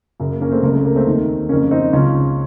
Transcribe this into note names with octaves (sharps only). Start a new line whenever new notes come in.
F#2 C#3
A#3
A#3 C#4
A3 C4
C#2 C#3 A#3
A3
A#3
A3 C4
D#2 D#3
F2 C#3 A#3 C#4
C4 D#4
C#2 C#3 C#4 F4